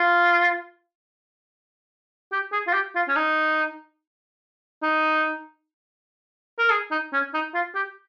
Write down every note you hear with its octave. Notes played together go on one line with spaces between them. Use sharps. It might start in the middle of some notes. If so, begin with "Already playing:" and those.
Already playing: F4
G4
G#4
F4
G4
F4
C#4
D#4
D#4
A#4
G#4
D#4
C#4
D#4
F4
G4